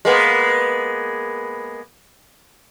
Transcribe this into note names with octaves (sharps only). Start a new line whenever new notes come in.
G#3 A#3 B3